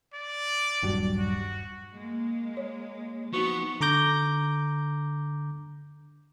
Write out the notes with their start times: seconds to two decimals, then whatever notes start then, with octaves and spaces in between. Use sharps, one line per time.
0.14 D5
0.82 D#1 G2 F#3
1.18 F#4
1.94 G#3 A#3
2.57 C#5
3.33 F3 B3 D#4 F#4 C#6
3.81 D3 A#5 D6 G6 A#6